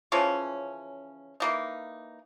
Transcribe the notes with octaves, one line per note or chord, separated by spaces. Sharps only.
C#3 E3 F3 C#4
E3 A#3 D#4